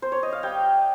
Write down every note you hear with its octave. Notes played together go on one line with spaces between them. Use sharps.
C5
C#5
D#5
F5
G3 G5